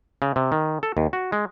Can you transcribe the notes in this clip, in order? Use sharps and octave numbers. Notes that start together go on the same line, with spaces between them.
C#3
C3
D#3
A4
D#2
F#4
G#3